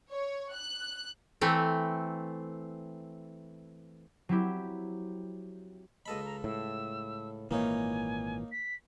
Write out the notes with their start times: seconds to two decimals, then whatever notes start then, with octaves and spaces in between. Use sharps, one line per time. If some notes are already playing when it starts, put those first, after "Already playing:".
0.12 C#5
0.54 F#6
1.41 E3 A3 C4
4.29 F#3 C4 E4 G4
6.06 C#2 A4 D#5 B5
6.25 A#5
6.44 A2 E6
7.51 G#1 A#2 E3 A#3 D#4 C#5 G#5
8.52 B6